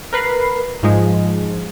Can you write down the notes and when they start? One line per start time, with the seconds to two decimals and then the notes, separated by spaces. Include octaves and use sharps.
0.13 A#4 B4 C7
0.83 G#2 F3 G#3